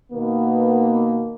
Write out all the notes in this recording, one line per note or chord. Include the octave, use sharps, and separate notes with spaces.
B2 D#3 A#3 B3